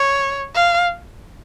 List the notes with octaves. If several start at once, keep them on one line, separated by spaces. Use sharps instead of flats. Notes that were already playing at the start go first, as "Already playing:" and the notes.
Already playing: C#5
F5